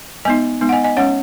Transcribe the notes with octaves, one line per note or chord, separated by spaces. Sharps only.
G#3 B3 D#4 D#5 G#5
G#3 B3 D#4
F#5
D#5 G#5
D#5 G#5
G#3 C#4 C#5 F#5